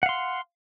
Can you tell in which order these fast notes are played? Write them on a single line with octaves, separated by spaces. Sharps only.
F#5 F5 C6